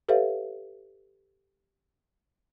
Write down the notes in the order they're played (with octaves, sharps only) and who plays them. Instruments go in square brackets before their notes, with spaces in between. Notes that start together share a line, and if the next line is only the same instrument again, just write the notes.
[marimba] G4 A4 B4 C#5 E5 F5